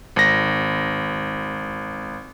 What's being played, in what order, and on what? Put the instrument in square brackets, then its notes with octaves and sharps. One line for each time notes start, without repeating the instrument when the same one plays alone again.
[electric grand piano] G#1 A#6